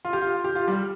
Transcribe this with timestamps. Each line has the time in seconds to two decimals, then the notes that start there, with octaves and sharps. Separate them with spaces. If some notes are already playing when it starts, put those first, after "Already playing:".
0.05 F4
0.13 G4
0.22 F4
0.44 G4
0.55 F4
0.67 G3 G4